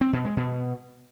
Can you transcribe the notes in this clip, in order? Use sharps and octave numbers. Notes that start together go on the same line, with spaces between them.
C4
B2
G#3
B2